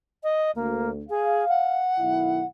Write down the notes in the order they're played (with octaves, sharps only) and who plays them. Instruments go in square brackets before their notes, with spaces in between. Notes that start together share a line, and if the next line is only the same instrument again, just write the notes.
[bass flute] D#5
[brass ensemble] D2 [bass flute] A#3
[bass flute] G#4 [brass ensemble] F5
[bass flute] F#5
[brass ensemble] B1 D#3 E4